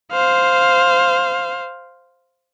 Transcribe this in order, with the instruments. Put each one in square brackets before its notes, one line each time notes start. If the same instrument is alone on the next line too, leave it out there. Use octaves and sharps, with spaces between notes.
[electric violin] C5 F5